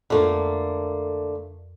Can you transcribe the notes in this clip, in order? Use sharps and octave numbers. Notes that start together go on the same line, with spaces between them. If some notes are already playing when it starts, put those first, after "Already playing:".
F2 D3 A3 A#3 F4 A4